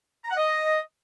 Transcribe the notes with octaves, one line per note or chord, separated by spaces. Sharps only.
A#5
F#5
D#5